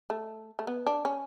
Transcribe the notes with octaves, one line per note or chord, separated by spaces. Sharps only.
A3
A3
B3
D4
C#4